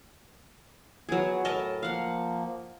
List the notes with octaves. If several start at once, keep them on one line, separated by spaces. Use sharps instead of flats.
F#3 B3 G#4
A2 A#4 D#5 A5
F3 A#3 F5 F#5